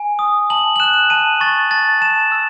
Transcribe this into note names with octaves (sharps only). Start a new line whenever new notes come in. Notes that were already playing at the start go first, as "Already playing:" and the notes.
Already playing: G#5
D#6
A5 F#7
F#7
F#6 E7
A5 D#7
C#6 A6
A5 A6
A5 E7
E6